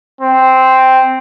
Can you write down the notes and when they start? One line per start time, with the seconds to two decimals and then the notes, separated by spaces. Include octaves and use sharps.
0.21 C4